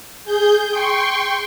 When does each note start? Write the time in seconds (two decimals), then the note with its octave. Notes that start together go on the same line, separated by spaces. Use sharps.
0.24 G#4 G6
0.70 G5 C6 C#6